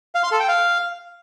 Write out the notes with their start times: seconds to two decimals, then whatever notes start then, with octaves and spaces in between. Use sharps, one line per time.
0.15 F5
0.23 C6
0.32 A4
0.40 G5
0.48 F5